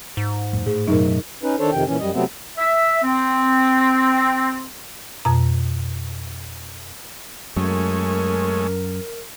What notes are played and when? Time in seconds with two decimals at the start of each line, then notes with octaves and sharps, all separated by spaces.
0.17 G#2
0.53 F2 A2
0.66 A2 A3 G#4
0.87 B1 F#2 D#4 A#4
1.43 C#4 D#4 B4
1.59 D#3 D4 A4 C5 C#5
1.72 F2 C3 D#3 G5
1.86 A#2 E3 C#4
2.00 F#2 G3 D#5
2.14 C3 F#3 A3 B3 C4
2.58 E5
3.02 C4
5.25 F2 B2 A#5
7.56 F#2 G#3 A3 C#4 A#4